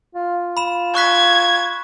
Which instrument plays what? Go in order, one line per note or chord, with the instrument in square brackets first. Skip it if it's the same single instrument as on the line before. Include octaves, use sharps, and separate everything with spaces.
[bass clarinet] F4
[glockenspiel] B5 E7
[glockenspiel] C#6 F#6 B6 [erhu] G#6